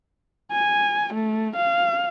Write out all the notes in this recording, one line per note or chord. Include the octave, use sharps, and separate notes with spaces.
G#5
A3
F5